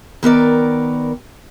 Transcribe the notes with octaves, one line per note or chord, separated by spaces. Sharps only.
D#3 B3 A#4 D5